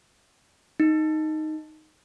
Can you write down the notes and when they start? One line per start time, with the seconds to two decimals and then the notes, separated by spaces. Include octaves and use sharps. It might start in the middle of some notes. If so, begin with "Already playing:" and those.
0.80 D#4